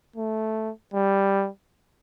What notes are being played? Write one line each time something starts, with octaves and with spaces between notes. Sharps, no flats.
A3
G3